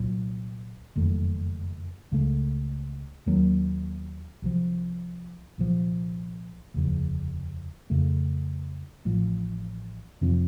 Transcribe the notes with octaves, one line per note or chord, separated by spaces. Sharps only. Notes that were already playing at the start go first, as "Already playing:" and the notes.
Already playing: C2 A#2 F#3
F#1 F2 D#3 A3
C#2 C#3 A3
D#2 D#3 F#3 A#3
C2 C3 F3
C2 A#2 F3
F1 D#2 C#3 F3
F2 C#3 A3
A1 A2 F3
F2 C3 F3 C4